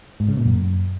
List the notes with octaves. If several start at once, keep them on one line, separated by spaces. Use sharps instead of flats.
G#2
C#3
A#2
F#2